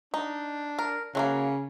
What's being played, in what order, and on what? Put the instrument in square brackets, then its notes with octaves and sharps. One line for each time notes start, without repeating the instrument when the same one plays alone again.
[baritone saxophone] D4 [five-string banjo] D#4
[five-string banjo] A#4
[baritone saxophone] C#3 [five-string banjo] F#3 A3 A#3